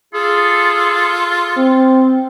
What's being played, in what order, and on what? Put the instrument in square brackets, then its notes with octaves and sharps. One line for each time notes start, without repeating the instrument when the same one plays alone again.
[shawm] F4 [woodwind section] G#4 A4
[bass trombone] C4